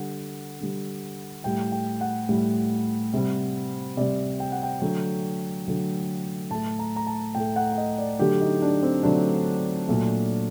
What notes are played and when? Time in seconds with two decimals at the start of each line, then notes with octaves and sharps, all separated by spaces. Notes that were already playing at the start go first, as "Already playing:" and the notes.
Already playing: D3 G3 F#5
0.61 D3 G3
1.44 A2 G3 G5
1.72 G5
2.01 F#5
2.29 A2 G3
3.13 C3 G3
3.97 C3 G3 D5
4.40 G5
4.52 F#5
4.63 G5
4.82 D3 F#3 A3
5.67 D3 F#3 A3
6.50 A2 A3 A5
6.79 A#5
6.96 A#5
7.07 A5
7.35 A2 A3 G5
7.56 F#5
7.72 F#5
7.78 D#5
7.98 D5
8.19 D3 F#3 A3 G4
8.41 D#4
8.62 D4
8.83 C4
9.03 D3 F#3 A3 D4
9.88 A#2 F#3 A3